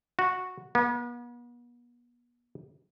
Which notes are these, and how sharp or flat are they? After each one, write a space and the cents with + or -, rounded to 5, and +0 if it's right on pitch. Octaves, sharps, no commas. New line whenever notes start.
F#4 -10
B3 -40